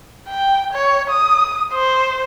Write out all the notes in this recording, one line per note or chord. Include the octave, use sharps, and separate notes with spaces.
G5
C#5
D#6
C5